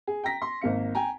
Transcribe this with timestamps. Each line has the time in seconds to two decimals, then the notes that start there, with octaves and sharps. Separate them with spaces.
0.07 G#4
0.24 G5 A#5 A#6 B6
0.42 C6
0.61 G#1 A#3 F5 C#7
0.95 G5 G#5 A#5